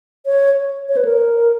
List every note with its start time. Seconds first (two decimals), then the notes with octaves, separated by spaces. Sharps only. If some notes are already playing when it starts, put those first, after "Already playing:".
0.26 C#5
0.89 C#5
0.97 B4
1.05 A#4